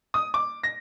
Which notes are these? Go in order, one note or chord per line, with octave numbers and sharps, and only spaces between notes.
D#6
D6
A#6